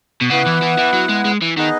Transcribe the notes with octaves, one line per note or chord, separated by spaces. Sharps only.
B2
C#3 B3 E4 B4 F#5
E3
E3
E3
F#3
G#3
G#3
E3
D#3 B3 D#4 G#4 B4 D#5